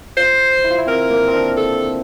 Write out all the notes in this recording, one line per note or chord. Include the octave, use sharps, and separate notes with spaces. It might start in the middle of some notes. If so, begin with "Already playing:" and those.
F4 C5
E4
F4
E4
C4 A#4
A#3
C4
D4
A4